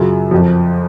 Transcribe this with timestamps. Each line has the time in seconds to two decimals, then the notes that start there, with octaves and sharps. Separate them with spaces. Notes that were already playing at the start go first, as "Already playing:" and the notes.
Already playing: F#2 C#3 F#3 F4
0.31 F2 F3